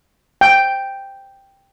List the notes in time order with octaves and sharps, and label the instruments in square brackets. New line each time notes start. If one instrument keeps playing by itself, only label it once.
[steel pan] G5